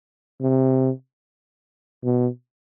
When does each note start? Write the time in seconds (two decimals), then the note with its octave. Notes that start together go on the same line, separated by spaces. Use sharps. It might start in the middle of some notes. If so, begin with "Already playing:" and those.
0.42 C3
2.04 B2